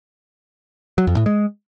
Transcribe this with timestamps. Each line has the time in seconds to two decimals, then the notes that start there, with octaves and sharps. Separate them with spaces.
0.98 F#3
1.07 F2
1.17 A2
1.26 G#3